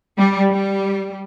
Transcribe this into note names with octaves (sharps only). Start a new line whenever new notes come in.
G3
G3